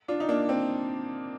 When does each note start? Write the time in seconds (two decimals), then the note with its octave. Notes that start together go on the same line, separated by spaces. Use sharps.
0.08 D4 F4
0.20 D#4
0.29 A#3 D4
0.49 C4